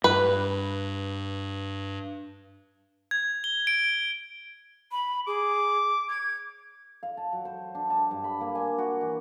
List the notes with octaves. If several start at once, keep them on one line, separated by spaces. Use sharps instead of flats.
G2 B4
G#6
G7
D7
B5
G#4 D6
G#6
F5
A5
F#3
C5
D4
A5
G2
B5
A#3
G#5
F#4
E3